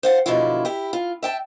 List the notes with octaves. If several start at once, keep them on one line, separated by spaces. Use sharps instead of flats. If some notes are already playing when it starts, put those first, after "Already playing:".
C5 F5 F#5
B2 D3 F3 F#3 E4 F4
E4 G4
F4
E5 G5 A5